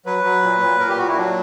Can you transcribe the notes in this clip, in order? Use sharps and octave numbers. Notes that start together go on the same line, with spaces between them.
F#3 B4
F#3
A#2
A#2
A#2 A#4
G4
A#2 F#4
E4
F#3 D4